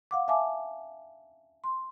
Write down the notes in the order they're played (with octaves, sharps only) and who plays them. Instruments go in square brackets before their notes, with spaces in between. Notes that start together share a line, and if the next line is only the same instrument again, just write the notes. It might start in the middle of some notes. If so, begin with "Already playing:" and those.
[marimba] F5 F#5 D6
E5 F5 G#5 A5 D6
C6